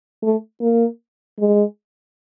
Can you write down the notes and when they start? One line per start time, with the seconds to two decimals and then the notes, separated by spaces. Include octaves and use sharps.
0.23 A3
0.61 A#3
1.40 G#3